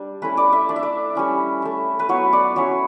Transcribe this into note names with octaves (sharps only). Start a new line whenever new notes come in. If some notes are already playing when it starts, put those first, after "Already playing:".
Already playing: G3 D4
A3 C#4 E4 B4
D5
E5
A3 D4 D5
E5
D5
G3 C#4 E4
A3 E4
B4
F#3 B3 E4 C#5
D5
F#3 C#4 E4 C#5